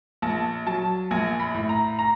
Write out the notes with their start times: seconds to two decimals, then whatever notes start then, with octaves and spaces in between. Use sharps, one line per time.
0.22 A#1 A5
0.66 F#3 A5
1.11 A#1 G#5
1.40 B5
1.54 A2
1.69 A#5
1.99 A#5